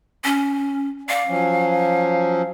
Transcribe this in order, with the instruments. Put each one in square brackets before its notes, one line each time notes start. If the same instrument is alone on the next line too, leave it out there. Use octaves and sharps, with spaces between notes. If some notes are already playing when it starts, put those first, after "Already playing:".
[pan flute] C#4
[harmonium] D5 [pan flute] F5
[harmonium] F3 F#3 C#4